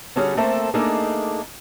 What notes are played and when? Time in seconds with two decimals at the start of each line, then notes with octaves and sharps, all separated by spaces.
0.16 D3 G3 C#4 F#4 G#4
0.37 A3 A#3 C4 A4 C5 E5
0.74 A3 A#3 D4 D#4 G#4